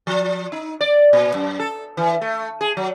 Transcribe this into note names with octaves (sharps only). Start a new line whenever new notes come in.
F3
D#4
D5
A#2
F#2
A4
E3
A3
G#4
F#3